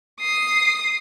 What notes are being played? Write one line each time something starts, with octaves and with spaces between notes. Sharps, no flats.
D#6 C7